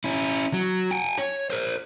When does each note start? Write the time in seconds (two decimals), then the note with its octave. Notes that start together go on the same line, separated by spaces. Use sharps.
0.04 C#4 E4
0.53 F#3
0.91 G5 G#5
1.18 C#5
1.50 A#4 C5